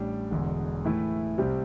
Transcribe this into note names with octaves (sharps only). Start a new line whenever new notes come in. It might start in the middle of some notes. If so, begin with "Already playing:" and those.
Already playing: A1 A2 G3 D4
E1 E2 D3
A2 E3 A3 E4
C2 C3 G3 C4